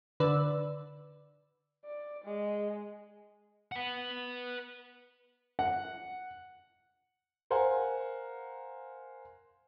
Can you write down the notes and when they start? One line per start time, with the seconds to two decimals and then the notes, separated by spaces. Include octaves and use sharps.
0.20 D3 B4 D5 E6
1.85 D5
2.25 G#3
3.72 B4 F#5
5.59 F#5
7.50 A#4 C5 F5 F#5 G#5